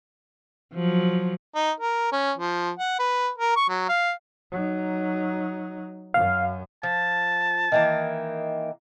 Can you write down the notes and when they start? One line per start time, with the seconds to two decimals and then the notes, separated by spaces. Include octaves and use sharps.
0.73 F3 F#3
1.55 D#4
1.80 A#4
2.12 C#4
2.38 F3
2.79 F#5
2.99 B4
3.38 A#4
3.56 C#6
3.69 F#3
3.89 F5
4.52 F#3 D#4
6.14 F#2 F5
6.83 F3 A5
7.72 D#3 E3 A#3